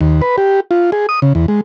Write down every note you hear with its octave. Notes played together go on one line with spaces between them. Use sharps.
D#2
B4
G4
F4
G#4
D#6
C#3
E2
G#3